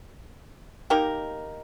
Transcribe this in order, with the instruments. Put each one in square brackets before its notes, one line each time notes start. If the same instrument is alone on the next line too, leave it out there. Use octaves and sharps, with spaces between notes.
[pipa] A#3 D#4 G4 A#4